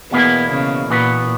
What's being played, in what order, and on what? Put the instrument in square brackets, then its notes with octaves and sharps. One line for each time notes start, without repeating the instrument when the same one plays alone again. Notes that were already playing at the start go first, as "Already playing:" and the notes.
[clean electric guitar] E2 B2 A#3 E4 G#4 [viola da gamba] B3
[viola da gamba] C#3
[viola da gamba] A#2 [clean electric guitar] E3 B3 F#4 B4